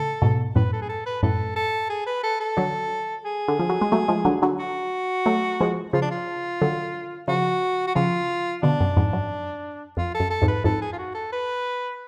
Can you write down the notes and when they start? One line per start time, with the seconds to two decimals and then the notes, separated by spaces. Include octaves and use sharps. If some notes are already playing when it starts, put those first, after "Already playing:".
Already playing: A2 C#3 A4
0.22 G#2 B2
0.55 F#2 A2 B4
0.73 A4
0.82 G#4
0.89 A4
1.06 B4
1.23 F#2 A2 A4
1.56 A4
1.90 G#4
2.07 B4
2.24 A4
2.40 A4
2.57 D3 F#3
3.25 G#4
3.48 D3
3.59 F3
3.70 F#3
3.81 G#3
3.92 F#3 A3
4.08 F3 G#3
4.25 D3 F#3
4.42 D3 F#3
4.59 F#4
5.26 F#3 A3
5.61 F3 G#3
5.93 C#3 F3 F4
6.02 D4
6.11 F4
6.62 D3 F#3
7.28 C#3 F3 F#4
7.87 F#4
7.95 C#3 F3 F4
8.63 B2 D3 D4
8.80 F#2
8.96 F2 G#2
9.13 F#2
9.97 F2 F4
10.14 A4
10.20 F#2
10.31 A4
10.42 F2 G#2
10.48 B4
10.64 F2 G#2 A4
10.82 G#4
10.93 F4
10.98 F#4
11.15 A4
11.32 B4